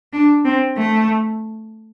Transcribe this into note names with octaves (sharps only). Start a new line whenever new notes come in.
D4
C4
A3